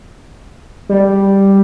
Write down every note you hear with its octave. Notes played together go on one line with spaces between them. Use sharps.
G3